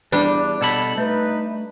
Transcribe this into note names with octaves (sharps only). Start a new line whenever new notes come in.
E2 G3 D4
B2 A4 B5
A3 D#4 B4